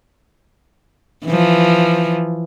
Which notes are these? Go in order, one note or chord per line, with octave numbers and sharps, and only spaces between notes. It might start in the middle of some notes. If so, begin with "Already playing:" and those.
E3 F3